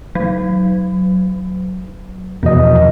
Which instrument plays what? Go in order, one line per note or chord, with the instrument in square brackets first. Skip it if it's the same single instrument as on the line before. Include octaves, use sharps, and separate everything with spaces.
[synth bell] F#3
[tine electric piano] E2 B2 D#5 [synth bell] F3